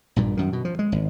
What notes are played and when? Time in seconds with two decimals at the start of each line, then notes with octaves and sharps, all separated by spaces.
0.16 A#1 G2 A#2
0.37 F#2 D#3
0.53 B2
0.65 F3
0.79 G#3
0.92 G#1